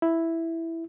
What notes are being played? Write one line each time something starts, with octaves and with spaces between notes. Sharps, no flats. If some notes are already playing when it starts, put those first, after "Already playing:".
E4